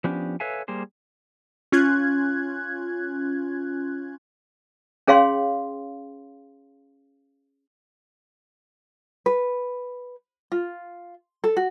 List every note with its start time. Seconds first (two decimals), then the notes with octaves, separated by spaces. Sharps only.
0.04 F3 B3 C#4 D4 G4
0.40 A4 B4 C#5 E5 F5 G#5
0.68 G3 A#3 G#4 C5
1.72 C#4 F4 F#6 G#6
5.08 C#4 G#4 C#5 F5 G5 C6
9.26 B4
10.52 F4
11.44 A4
11.57 F#4